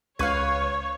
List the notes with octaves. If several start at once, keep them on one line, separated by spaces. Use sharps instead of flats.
C#2 B4 C#5 F5 C#6 G#6